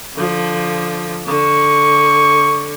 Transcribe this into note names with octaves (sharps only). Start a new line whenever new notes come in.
D3 F3
D3 C#6